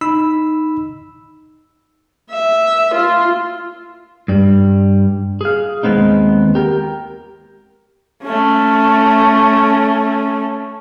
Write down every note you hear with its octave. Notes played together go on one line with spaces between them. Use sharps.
D#4 B5 E6
E5
F4
G2 G3
G#4 F5
D#2 G#3 A3 B3 C4 D#4
G4 A#4
A3 C#4